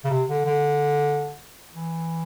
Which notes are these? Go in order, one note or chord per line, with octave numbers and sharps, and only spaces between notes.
C#3
C3
D3
D3
E3